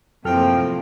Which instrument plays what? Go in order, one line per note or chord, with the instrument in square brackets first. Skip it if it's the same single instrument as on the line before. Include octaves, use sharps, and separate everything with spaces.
[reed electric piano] F#2 A4 F6 [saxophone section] A2 F3 [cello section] C3 A#3 [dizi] G5